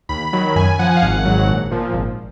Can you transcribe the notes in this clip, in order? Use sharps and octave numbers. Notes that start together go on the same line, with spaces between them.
D#2 B5
D#3 F#3 B5
F#2 G#5
F3 F#5
F5
G#1 F#5
G#2 F#3
A#1
A#2 F3
G#1